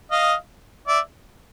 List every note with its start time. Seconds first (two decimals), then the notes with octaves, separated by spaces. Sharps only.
0.11 D#5 F5
0.87 D5 E5